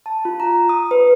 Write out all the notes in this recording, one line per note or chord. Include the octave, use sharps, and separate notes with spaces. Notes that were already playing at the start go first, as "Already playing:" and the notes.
A5
F4
A#5
D#6
B4